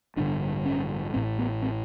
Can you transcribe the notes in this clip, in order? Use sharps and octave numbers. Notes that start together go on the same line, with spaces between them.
A1 G2 D3 D4
C#4
A1 A2 C4
B3
C4